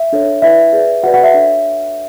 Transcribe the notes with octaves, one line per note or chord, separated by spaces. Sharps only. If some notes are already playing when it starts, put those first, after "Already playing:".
Already playing: E5
D4 A4 C#5
E4 B4 D5 E5
G#4 B4 D5
F#4 B4 D5 F#5
F#5
E5
D4 A4 C#5